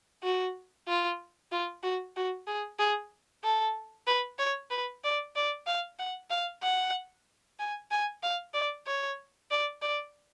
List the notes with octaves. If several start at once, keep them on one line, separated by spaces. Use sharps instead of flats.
F#4
F4
F4
F#4
F#4
G#4
G#4
A4
B4
C#5
B4
D5
D5
F5
F#5
F5
F#5
G#5
G#5
F5
D5
C#5
D5
D5